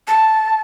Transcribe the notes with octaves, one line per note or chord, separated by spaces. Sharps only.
A5